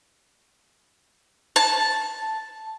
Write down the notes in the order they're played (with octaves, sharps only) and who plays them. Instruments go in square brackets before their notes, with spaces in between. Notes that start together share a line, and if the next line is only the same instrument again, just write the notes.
[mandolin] A5